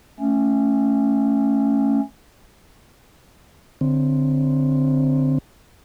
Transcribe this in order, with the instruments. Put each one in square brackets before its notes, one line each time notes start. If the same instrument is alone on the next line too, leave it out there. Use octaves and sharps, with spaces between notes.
[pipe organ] A3 C#4
[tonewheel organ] D3 C4